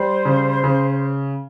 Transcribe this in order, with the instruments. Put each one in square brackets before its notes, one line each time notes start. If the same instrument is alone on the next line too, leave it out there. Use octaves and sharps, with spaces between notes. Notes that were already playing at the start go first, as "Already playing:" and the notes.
Already playing: [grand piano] G3 [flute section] C5
[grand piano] C#3
C#3